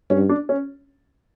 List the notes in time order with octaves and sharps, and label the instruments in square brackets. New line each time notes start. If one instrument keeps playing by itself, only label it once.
[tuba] G2 [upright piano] C#4
[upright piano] D4
C#4